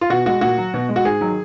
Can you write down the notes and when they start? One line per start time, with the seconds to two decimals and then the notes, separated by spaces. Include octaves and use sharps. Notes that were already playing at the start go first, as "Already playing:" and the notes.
0.01 F4
0.10 B2 F#4
0.26 G#3 F#4
0.41 A#2 F#4
0.58 F#3
0.74 B2
0.89 G#3
0.96 F#4
1.05 G#2 G#4
1.21 D#3 F#3